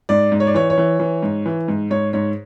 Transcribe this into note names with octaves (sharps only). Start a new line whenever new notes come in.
G#2 D5
G#2
C#5
D5
E3 C#5
C#5
E3
E3
G#2
E3
G#2
G#2 C#5
G#2 C#5